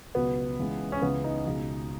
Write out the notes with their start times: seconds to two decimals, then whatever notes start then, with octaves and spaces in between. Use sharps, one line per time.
0.15 C#2 B2 F#3 B3
0.59 C#2 C#3 E3 G#3
0.92 C#4
1.02 C#2 C#3 E3 B3
1.24 D#4
1.45 C#2 B2 G#3